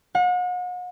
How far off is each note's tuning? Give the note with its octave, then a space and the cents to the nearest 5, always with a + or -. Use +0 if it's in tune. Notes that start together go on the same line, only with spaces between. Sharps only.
F#5 -40